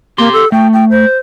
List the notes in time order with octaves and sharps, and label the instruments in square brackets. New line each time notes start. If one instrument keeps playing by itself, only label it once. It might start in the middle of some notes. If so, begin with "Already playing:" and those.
[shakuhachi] A#3 [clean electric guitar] G4 C6
[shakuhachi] A4
[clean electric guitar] A3 [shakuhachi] G5
[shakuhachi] G5
C5